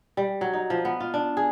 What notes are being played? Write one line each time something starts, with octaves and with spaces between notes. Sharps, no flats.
G3
F#3
D#4
F3
B3
F4
D4
G#4